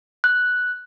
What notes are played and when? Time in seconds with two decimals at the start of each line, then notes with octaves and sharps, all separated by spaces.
0.24 F#6